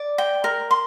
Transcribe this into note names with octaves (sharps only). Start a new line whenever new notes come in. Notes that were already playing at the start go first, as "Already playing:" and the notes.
Already playing: D5
G5
A#4
C6